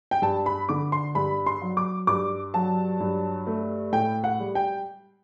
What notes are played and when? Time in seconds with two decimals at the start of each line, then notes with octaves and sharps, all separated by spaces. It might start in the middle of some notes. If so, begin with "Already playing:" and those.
0.11 G5
0.22 G2 A5
0.46 B5
0.69 D3 D6
0.92 C6
1.15 G2 B5
1.46 C6
1.62 F#3
1.77 D6
2.07 G2 D6
2.54 F#3 A5
3.00 G2
3.47 A3
3.92 A2 G5
4.24 F#5
4.40 G3
4.55 G5